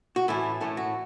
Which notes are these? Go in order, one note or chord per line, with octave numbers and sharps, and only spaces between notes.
F#4
A2 E3 A3 C#4 E4
A2 E3 A3 C#4
F#4